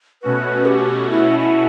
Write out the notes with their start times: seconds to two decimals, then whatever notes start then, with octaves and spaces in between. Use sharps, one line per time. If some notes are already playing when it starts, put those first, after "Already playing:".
0.22 B2 A3 C#4 F#4 B4
0.66 G4
1.10 E4
1.39 E4